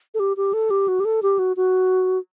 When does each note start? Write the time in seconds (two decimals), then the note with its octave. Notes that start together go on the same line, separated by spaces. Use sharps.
0.14 A4
0.20 G4
0.37 G4
0.53 A4
0.70 G4
0.88 F#4
1.00 G4
1.05 A4
1.23 G4
1.39 F#4
1.57 F#4